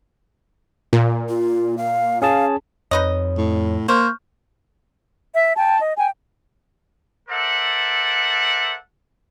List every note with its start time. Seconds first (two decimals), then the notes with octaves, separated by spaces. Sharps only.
0.93 A#2
1.29 F4
1.78 F5
2.22 C#4 G#4 F5 A5
2.91 F2 D#4 B4 C#5 D#5
3.38 A2
3.88 A#3 C5 C#6 F6 G6
5.35 E5
5.56 G5 A5
5.81 D#5
5.98 G5 G#5
7.29 A4 A#4 C5 D5 E5 F#5